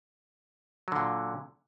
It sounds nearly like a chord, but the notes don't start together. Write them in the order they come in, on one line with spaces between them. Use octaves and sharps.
F#3 D3 A#2